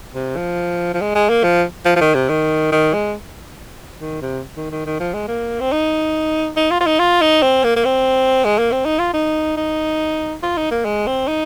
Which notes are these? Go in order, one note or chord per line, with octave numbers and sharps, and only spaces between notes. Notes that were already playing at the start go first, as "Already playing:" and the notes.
C3
F3
F3
G#3
G#3
A#3
F3
F3
F3
D#3
C3
D#3
D#3
G#3
D#3
C3
D#3
D#3
D#3
F3
G#3
A#3
C4
D#4
D#4
F4
F4
D#4
F4
D#4
C4
A#3
A#3
C4
G#3
A#3
C4
D#4
F4
D#4
D#4
F4
D#4
A#3
G#3
C4
D#4